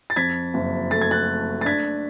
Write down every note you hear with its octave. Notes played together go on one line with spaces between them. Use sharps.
A6
F2 G#6 B6
F#1
A3 A6
G#6
F#6 A6
A3
A6
D4 G#6 B6